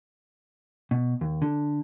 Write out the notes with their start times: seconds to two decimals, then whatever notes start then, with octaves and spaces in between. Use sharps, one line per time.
0.91 B2
1.21 D#2
1.42 D3